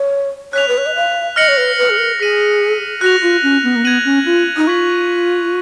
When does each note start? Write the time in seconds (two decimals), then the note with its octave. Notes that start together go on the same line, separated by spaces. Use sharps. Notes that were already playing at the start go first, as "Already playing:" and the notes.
Already playing: C#5
0.53 C#5 F#6 B6 F7
0.68 B4
0.78 C#5
0.86 D#5
0.96 F5
1.36 D#5 F6 A#6 C#7 F#7
1.48 C#5
1.57 B4
1.78 B4
1.90 G#4
1.98 A#4
2.19 G#4 F6 B6 D#7 F#7
3.01 F#4 F#6 A#6 F7
3.22 F4
3.43 C#4
3.63 B3
3.76 A#3
3.84 B3 G#6 D#7 F#7
4.05 C#4
4.26 F4
4.57 D#4
4.67 F4 C#6 G#6 B6 F#7